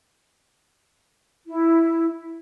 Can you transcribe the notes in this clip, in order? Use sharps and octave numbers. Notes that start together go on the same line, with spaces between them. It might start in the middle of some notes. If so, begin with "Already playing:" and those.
E4